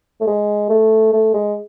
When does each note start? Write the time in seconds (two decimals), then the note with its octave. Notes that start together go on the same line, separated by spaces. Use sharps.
0.21 A3
0.27 G#3
0.70 A3
1.13 A3
1.34 G#3